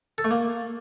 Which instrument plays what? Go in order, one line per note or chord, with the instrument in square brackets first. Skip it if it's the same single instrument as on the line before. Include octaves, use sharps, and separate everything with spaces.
[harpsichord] A4
A3
A#3